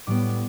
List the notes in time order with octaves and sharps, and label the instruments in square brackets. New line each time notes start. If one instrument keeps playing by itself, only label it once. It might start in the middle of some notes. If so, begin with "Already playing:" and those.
[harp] A2 G3 B3 D6